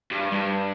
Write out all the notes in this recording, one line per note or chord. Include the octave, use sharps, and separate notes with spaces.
G2
G2